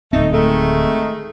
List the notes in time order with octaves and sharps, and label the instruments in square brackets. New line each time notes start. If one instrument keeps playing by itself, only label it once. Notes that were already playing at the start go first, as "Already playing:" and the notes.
[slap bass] D1 C4 [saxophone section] A3 D#4
[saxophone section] D#3 G#3 A3